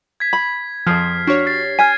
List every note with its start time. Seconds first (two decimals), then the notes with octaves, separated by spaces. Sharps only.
0.20 G#6 B6
0.33 B5
0.87 F2 F3 G#4 F6 C7
1.27 D4 F#4 G4 C#5
1.46 F6 A6 C7
1.79 G#5 F6 G#6 B6 D#7